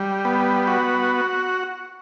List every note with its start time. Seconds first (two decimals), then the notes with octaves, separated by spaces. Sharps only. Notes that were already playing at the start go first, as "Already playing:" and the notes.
Already playing: G3
0.25 B3
0.67 F#4